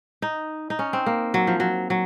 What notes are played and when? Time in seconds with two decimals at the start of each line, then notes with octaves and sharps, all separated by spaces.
0.22 D#4
0.70 D#4
0.79 C#4
0.93 C4
1.06 A#3
1.34 F#3
1.47 F3
1.60 F#3
1.90 F#3